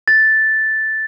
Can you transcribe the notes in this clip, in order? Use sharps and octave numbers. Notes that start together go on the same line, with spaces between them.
A6